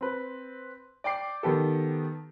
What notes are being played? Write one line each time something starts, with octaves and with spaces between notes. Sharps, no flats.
C4 B4
D5 G5 D6 C7
D#3 B3 G4 A4